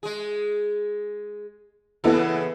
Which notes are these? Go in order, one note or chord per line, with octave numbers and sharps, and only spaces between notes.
G#3 G#4
C#3 E3 B3 E4 A4